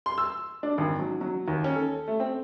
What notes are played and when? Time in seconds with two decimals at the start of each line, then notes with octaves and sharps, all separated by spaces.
0.06 C6
0.18 E6
0.63 D4
0.78 G#1
0.99 F#3
1.21 F#3
1.48 D#2
1.64 C#4
1.76 A4
2.08 A3
2.20 C4